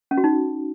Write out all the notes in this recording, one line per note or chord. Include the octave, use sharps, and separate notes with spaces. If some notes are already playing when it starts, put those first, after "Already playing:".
C#4
F#4
D#4